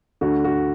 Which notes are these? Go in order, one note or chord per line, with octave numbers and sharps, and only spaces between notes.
D2 D3 F#4
F#4